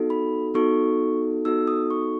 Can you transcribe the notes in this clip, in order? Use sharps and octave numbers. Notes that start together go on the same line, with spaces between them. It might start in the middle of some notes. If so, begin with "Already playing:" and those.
Already playing: B3 D#4 F#4 A4
B5
B3 D#4 F#4 A4 C#6
B3 D#4 F#4 A4 E6
D#6
C#6